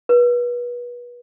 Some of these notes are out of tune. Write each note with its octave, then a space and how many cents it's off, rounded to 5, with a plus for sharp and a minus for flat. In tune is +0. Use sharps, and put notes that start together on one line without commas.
B4 -30